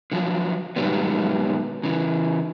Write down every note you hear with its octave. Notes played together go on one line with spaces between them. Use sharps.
D3 F3 F#3
G#2 B2 D#3 F#3 G3 B3
C#3 E3